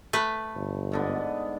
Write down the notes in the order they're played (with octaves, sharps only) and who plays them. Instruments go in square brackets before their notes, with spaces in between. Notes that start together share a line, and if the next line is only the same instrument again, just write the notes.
[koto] A3 B4
[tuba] G1
[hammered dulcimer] G#2 D3 B3